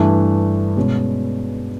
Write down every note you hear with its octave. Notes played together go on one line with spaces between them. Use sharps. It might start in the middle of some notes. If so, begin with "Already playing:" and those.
Already playing: G2 E3 A3 D4
B2 G#3 C#4